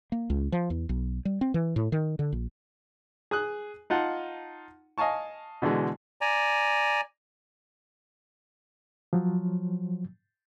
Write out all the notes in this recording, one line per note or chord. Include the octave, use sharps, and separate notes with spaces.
A#3
C#2
F3
E2
B1
G3
C4
E3
A2
D#3
D3
A#1
G#4 D#6 F#6
D#4 F4 F#5 A5
D#5 F5 G#5 A5 C#6
B2 D3 E3 G#3
D5 G#5 A#5
F3 F#3